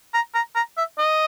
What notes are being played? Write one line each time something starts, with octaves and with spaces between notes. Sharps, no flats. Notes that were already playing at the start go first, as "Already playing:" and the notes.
A#5
A#5
A#5
E5
D#5